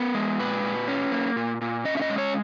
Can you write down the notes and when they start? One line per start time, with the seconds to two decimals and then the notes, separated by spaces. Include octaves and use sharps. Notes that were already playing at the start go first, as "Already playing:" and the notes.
Already playing: B3 A#4
0.15 G#3
0.39 A#2 B4
0.63 A#2
0.88 C#4
1.12 A#3
1.36 A#2
1.61 A#2
1.85 C#4 D#5
1.97 E5
2.02 D#5
2.10 G#3
2.18 C#5